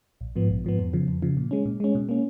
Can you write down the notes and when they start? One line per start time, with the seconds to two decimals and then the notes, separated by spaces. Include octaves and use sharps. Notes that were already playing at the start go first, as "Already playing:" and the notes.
0.21 A#1
0.36 G#2 F3 B3
0.50 A#1
0.65 G#2 F3 B3
0.79 F2
0.93 C#3 F3
1.08 F2
1.22 C#3 F3
1.37 A#2
1.51 G#3 C#4
1.65 A#2
1.80 G#3 C#4
1.95 B2
2.09 A#3 C#4